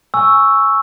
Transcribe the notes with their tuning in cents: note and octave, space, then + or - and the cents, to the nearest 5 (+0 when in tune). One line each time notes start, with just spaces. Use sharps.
G#5 +0 C#6 +0 E6 +0